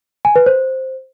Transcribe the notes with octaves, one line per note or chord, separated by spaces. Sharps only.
G#5
B4
C5